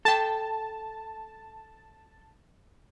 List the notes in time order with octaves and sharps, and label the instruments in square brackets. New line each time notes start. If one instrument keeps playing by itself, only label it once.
[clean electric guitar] A4 G5 [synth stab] A5